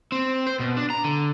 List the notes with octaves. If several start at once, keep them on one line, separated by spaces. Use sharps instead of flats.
C4
C5
B2
D4
A#5
D3